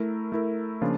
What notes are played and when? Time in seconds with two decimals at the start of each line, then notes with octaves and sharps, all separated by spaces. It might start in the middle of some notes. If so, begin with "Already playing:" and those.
Already playing: A3 E4 A#4
0.32 A3 E4 A#4
0.81 C#3 F3 A#3 D4 F4